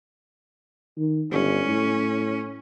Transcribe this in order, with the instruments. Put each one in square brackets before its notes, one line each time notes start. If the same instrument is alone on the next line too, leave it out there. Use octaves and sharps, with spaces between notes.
[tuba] D#3
[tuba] G1 [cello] C#4
[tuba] A2